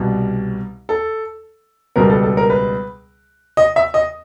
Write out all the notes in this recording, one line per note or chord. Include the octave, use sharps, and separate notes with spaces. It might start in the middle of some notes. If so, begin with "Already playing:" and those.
Already playing: C2 B2 G3 B3
A4
C#2 B2 G3 B3 A#4
A4
A4
A#4
B4
D#5
E5
D#5